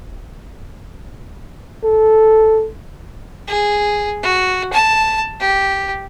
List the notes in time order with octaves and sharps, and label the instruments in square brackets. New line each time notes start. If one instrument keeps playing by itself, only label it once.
[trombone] A4
[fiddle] G#4
F#4
A5
G4